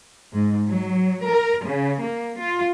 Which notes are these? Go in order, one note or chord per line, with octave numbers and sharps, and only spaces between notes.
G#2
F#3
A#4
C#3
A#3
F4